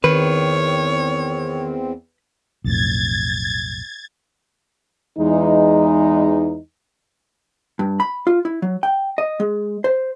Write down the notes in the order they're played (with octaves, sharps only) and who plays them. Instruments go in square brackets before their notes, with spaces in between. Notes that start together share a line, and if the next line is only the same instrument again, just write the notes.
[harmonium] E2 C4 [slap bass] D#3 [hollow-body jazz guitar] B4 [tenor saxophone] C#5
[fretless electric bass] B1 F2 A2 [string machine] G#6 A6
[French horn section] E2 E3 G#3 D#4
[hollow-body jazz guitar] G2
B5
F4
E4
F#3
G5
D#5
G#3
C5